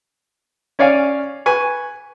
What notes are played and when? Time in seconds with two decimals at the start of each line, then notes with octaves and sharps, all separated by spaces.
0.79 C#4 C#5 D5 F5 G#5
1.46 B4 G#5 C#6